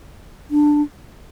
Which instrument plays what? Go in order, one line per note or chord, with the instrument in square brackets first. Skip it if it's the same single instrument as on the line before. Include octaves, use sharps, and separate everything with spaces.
[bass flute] D4